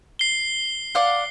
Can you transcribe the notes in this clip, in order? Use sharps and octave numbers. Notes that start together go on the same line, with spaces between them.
C7 G7
D5 F5 F#5